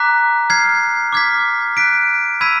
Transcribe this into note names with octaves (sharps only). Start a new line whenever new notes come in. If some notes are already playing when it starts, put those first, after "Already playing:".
Already playing: A#5 D6 F#6 B6
F6 G#6 C7
D6 F6 G#6 B6
F#6 B6 D7
B5 E6 G#6 B6 D#7